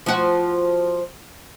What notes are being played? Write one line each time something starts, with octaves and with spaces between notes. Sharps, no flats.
F3 F#4